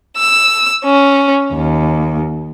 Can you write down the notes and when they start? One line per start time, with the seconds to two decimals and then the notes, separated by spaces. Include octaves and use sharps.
0.16 E6
0.84 C#4
1.53 D#2